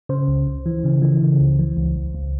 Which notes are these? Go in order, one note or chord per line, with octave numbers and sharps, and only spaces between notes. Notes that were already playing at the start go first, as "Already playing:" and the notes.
C#3 C5
C#2
C#2
E3
C#3
E3
C#3
C#2
E3
C#2
C#2
C#2